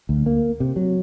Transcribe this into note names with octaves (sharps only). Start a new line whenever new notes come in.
D2
A#3
C3
F#3